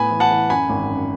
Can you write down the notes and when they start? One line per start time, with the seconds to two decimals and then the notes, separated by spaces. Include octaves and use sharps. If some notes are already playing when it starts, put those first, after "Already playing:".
Already playing: A2 B3 G#5 B5
0.11 E3
0.20 F#5 A5
0.31 E3
0.50 F#2 G#5 B5
0.70 G#1
0.90 F#2